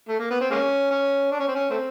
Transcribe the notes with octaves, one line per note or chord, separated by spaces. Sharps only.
A3
A#3
B3
C4
G#3 A#3 C#4
C#4
D4
C#4
C4
C#4
A3 C4